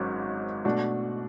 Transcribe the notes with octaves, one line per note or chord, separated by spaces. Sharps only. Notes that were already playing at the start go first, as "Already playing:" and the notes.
Already playing: G#1 G#2 F#3 C#4
B2 A3 D4 F#4